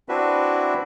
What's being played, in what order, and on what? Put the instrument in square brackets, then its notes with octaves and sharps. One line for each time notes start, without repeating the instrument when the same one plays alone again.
[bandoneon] C4 D4 E4 F#4 B4 E5